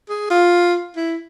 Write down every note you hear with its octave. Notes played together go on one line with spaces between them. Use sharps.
G#4
F4
E4